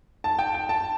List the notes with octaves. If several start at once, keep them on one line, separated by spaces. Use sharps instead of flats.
A5
G5
G5
A5